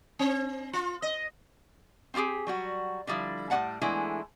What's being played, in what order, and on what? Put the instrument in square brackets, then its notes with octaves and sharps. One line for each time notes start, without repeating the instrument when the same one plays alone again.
[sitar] C4
F4
D#5
[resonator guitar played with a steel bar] C4 D#4 F4 G4 G#4
F#3 G3 F#4
D3 F3 G3 E4
A2 G3 B3 D5 F#5 A5
E3 G#3 A3 B3 D4 E4